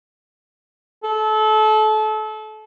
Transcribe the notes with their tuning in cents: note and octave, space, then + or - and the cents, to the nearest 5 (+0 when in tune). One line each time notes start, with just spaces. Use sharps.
A4 -30